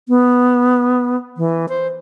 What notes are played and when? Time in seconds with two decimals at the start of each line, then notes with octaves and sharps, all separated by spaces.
0.09 B3
1.37 E3
1.69 C5